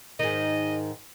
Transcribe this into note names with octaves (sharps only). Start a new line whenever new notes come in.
G#2 D#3 D#5